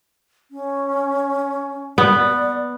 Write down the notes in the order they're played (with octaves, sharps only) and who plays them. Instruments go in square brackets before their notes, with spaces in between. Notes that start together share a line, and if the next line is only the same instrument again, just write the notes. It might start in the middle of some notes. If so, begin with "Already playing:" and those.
[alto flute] C#4
[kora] B3 [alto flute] D5